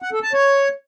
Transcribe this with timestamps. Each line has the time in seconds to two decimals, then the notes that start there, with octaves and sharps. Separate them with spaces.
0.02 F#5
0.13 A4
0.23 A5
0.33 C#5